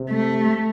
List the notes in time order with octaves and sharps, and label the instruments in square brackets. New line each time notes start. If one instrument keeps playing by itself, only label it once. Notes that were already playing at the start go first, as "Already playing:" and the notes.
Already playing: [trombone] C3
[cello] A3